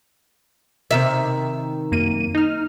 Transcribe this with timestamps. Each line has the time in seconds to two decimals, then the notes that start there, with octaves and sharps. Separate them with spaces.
0.91 C3 D#3 E5
1.92 F#2 A#3 D#7
2.35 D#4 F6